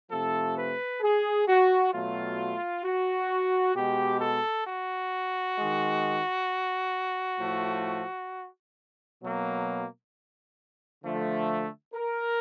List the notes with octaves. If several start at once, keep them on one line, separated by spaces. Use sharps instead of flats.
C3 F3 A3 A4
B4
G#4
F#4
B2 F#3 A3 F4
F#4
B2 G#3 G4
A4
F#4
D#3 G#3
A2 F3 A3
B2 F#3 A#3
D3 F3 A3
A#4